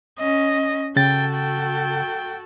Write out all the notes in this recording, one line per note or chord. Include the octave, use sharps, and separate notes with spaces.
C#4 D#5
C#3 F#4 A4 G5 A6
G5